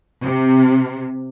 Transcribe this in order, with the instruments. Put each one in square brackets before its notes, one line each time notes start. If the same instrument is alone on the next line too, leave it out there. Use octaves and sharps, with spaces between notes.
[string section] C3